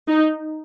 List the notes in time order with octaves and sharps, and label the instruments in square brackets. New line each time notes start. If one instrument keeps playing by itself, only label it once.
[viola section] D#4